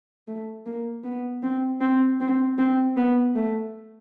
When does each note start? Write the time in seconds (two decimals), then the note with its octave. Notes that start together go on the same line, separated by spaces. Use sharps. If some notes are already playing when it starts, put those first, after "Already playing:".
0.28 A3
0.66 A#3
1.04 B3
1.43 C4
1.81 C4
2.21 C4
2.58 C4
2.97 B3
3.36 A3